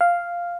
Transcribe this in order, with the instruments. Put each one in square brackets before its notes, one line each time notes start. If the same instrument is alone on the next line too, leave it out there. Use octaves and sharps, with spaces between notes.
[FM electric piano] F5